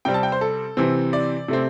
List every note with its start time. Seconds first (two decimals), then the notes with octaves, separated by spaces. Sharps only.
0.05 C3 G3 C4 G5
0.14 A5
0.23 G5
0.32 C5
0.41 A4
0.77 C3 E3 C4
1.13 D5
1.48 C3 A3 C4